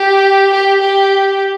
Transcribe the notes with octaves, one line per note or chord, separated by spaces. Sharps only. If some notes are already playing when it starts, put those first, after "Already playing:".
Already playing: G4
G4
G4